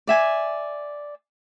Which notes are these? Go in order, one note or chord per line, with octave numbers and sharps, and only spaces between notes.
D5 E5 G#5